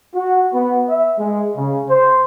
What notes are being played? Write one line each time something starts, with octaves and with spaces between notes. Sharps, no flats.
F#4
B3
E5
G#3
C#3
C5